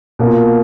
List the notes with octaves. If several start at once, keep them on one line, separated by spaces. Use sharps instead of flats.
B2 A#3 F4